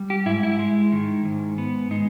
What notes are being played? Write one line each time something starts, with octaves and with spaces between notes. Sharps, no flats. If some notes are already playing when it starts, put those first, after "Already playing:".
Already playing: G3
G4
G#2 E4
E4
G#3
D#3
G#2
B3
G#3 D#4